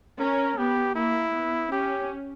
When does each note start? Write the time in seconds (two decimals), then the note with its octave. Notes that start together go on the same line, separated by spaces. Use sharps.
0.19 C#4 A#4
0.58 B3 G4
0.95 A#3 E4
1.33 B3
1.72 C#4 G4